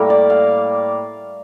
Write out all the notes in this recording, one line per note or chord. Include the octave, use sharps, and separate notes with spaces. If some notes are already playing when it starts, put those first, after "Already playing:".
Already playing: A2 G3 A#3 A#4
D5
F5